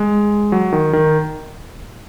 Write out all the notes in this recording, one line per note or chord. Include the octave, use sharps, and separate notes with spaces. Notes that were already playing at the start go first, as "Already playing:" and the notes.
Already playing: G#3
F#3
D#3
D#3